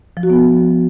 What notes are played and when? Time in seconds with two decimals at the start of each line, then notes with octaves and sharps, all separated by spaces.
0.17 F3
0.23 F#4
0.30 B3